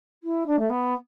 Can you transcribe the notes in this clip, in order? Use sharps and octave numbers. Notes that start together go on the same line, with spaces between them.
E4
D4
A3
B3